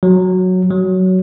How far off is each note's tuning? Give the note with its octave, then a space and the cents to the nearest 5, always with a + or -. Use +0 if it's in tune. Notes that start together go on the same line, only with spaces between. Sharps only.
F#3 -5
F#3 +10